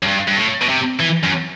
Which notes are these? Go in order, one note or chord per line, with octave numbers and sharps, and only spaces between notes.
F#2
G2
G2
A2
B2
C3
E3
F#2